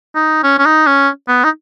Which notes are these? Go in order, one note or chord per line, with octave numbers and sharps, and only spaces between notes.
D#4
C#4
C#4
D#4
C#4
B3
D#4